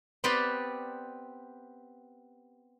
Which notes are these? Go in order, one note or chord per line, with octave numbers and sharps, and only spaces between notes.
B3 C4 G4 B4 D5 C6